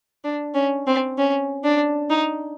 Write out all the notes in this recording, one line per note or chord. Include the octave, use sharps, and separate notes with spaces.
D4
C#4
C4
C#4
D4
D#4